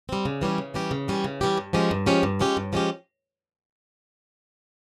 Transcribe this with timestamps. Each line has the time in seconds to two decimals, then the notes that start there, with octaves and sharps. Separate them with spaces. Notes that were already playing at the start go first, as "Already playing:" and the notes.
0.09 G3 C4
0.25 C#3
0.42 E3 G3 C#4 G4
0.58 C#3
0.74 E3 G3 C#4 G4
0.91 C#3
1.08 E3 G3 C#4 G4
1.24 C#3
1.41 E3 G3 C#4 G4
1.58 G2
1.73 F3 G#3 C#4 G4
1.91 G2
2.06 F3 G#3 C#4 G4
2.23 G2
2.39 F3 G#3 C#4 G4
2.57 G2
2.73 F3 G#3 C#4 G4